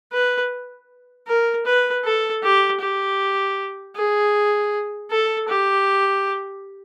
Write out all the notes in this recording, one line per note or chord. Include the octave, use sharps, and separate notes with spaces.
B4
A#4
B4
A4
G4
G4
G#4
A4
G4